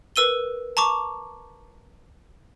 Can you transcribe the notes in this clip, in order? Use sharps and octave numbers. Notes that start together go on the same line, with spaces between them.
A#4 B4 E6 D#7 G7
A5 A#5 C#6 D6